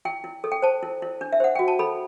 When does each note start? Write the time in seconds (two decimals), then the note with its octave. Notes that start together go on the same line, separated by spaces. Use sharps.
0.05 E4 G5
0.24 E4
0.44 A4
0.52 G5
0.62 C5 A5
0.83 E4
1.02 E4
1.21 D4
1.32 E5
1.40 C5 F#5
1.55 F#4 G5
1.68 A5
1.79 A4 B5